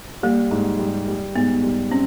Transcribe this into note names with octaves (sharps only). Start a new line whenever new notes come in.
G3 A#3
G#2
G3
G3
G#2 B3
G3
C4 C#4